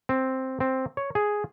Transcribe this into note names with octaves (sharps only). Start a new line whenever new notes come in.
C4
C4
C#5
G#4